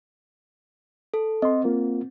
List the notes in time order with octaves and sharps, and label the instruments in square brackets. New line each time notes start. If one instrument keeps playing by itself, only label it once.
[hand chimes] A4
[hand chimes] C4 [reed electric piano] D#5 C6
[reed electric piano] A#3 F4 A#4